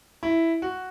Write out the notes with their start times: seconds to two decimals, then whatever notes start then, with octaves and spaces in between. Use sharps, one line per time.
0.23 E4
0.62 F#4